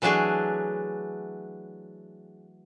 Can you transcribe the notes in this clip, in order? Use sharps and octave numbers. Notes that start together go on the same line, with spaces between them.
E3 F#3 A3 D4 G#4